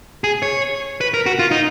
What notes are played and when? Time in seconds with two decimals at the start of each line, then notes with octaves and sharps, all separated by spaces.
0.24 G#4
0.42 C#5
1.01 B4
1.14 A#4
1.26 F#4
1.39 F4
1.51 D#4